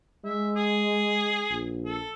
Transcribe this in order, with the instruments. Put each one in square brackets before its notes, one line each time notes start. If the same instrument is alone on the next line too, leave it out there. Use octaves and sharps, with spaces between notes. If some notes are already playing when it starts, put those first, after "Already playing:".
[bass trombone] G#3 [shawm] E5
[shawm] G#4
[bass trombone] A#1
[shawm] A4